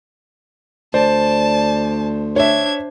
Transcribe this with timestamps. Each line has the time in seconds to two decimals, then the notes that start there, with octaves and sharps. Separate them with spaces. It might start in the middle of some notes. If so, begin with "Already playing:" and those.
0.94 D2 C5 D5 A5
2.36 D4 C#5 E5 G#6